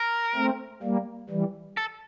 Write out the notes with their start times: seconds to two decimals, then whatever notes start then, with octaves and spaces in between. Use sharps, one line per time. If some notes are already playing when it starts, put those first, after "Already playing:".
Already playing: A#4
0.35 A3 C4
0.83 G3 A#3
1.30 E3 G3
1.77 A4